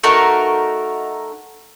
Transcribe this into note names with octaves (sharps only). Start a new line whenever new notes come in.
A3 D#4 F#4 A#4